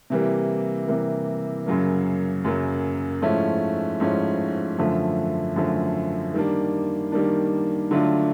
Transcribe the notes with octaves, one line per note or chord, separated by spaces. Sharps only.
C3 E3 G3 A#3
C3 E3 G3 A#3
F#2 C#3 F#3 A#3
F#2 C#3 F#3 A#3
G#2 F3 A3 C#4 E4
G#2 F3 A3 C#4 E4
F#2 D3 F3 A3
F#2 D3 F3 A3
D#3 G3 A#3 D4
D#3 G3 A#3 D4
D3 F#3 A3 D4 F4